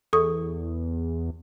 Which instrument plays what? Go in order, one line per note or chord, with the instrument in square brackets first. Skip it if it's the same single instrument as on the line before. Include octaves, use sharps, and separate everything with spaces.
[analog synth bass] E2 [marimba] A4 C#6 D#6